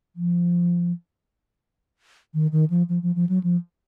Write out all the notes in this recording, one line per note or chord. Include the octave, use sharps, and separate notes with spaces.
F3
D#3
D#3
F3
F3
F3
F3
F#3
F3